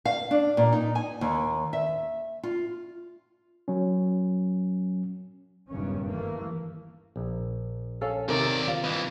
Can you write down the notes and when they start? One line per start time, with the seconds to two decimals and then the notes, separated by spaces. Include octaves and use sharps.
0.05 F5
0.31 D4
0.57 A#2
0.73 D#4
0.95 G#5
1.21 D#2
1.73 E5
2.43 F4
3.68 F#3 C#4
5.69 F#1 E2 G2 A#2 D#3 C#4
6.08 D#2 E3 A3 A#3
7.16 A#1
8.01 C#4 A4 F5
8.29 D#2 C3 D#3 A#4 D5
8.68 F4
8.84 C2 E3 B4 D#5